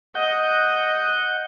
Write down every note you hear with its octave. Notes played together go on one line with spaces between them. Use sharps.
D#5 F#5 G6